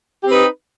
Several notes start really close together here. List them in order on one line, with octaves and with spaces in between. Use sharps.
G4 C4 B4 D#4